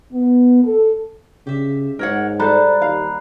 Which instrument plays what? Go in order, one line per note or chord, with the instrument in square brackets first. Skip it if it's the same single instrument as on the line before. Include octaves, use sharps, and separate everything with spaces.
[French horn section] B3
A4
[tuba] C#3 [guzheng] G4 E5
[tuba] G#2 [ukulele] A#4 C#5 F#5
[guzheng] G3 [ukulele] A4 C5 [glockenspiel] A#5 B5 F#6
[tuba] D#2 [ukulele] F5